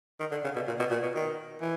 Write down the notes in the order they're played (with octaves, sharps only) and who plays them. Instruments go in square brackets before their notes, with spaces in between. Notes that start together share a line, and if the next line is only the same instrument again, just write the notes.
[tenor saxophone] D#3
D3
C#3
B2
A#2
B2
A#2
B2
D#3
E3